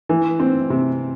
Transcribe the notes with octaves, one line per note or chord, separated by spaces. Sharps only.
E3
C4
C3